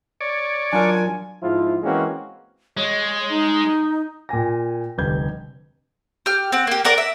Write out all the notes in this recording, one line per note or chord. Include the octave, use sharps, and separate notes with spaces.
C#5 D5
F#3 D4 F4 A#4 G#5
G#2 F3 E4 F4
E3 G#3 A#3 C4 C#4 F#4
G#3 C#5
D#4
A#2 G5 G#5 A#6
F1 D2 G3 B4 G6 G#6
G4 F6
C4 F#5
A#3 G4
F#4 A#4 D5 D6
E5